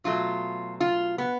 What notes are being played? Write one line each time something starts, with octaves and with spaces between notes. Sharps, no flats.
B2 F#3 A3 F4
F4
B3